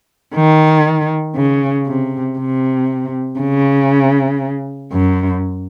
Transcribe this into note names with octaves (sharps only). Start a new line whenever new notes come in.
D#3
C#3
C3
C3
C#3
F#2